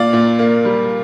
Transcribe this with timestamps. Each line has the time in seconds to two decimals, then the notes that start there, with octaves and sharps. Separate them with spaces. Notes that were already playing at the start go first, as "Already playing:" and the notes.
Already playing: A#2 D5 F5
0.13 A#2
0.39 A#3
0.65 G3